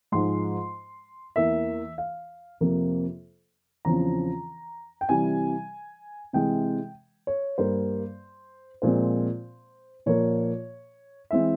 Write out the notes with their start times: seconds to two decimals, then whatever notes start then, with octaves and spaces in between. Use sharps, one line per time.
0.12 G#2 F3 G#3 C6
1.36 E2 E3 A#3 E5
1.98 F5
2.61 F2 C3 F3 A#3
3.85 E2 C#3 F3 C4 A#5
5.01 G5
5.09 C3 E3 G3 G#5
6.33 C3 E3 G#3 G5
7.27 C#5
7.58 G2 G3 A#3 C5
8.82 A#2 F3 G#3 C4 C5
10.06 A#2 F3 A#3 C#5
11.31 E3 G#3 C4 E5